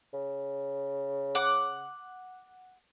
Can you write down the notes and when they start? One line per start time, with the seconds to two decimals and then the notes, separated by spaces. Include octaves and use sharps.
0.14 C#3
1.35 F#5 D6